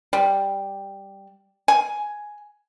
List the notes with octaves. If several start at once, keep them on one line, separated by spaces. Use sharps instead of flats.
G3
G#5